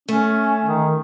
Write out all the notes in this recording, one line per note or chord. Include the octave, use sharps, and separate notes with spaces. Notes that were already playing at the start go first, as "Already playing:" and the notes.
A3 C#4
D#3